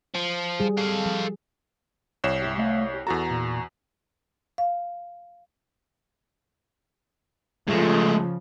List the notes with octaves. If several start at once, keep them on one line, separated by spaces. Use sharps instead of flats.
F3
G3 G#4
A4 F5
F3
C2 C#5 E7
G2 E4 G4
A3 E5 F5
G4
E2 F#4 A4 A#5
A#2
F5
C#3 F3 G#3 A3